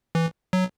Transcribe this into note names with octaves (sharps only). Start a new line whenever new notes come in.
E3
F#3